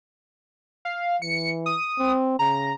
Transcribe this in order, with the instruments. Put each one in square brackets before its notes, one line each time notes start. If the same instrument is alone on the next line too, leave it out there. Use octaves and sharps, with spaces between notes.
[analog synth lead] F5
[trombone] E3 [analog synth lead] C#7
[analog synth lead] D#6
[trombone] C4
[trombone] C#3 [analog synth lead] A#5